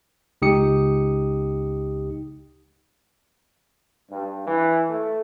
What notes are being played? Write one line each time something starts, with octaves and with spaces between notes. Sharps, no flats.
C#2 D#4 G4 D#6 C#7
G2
E3
A3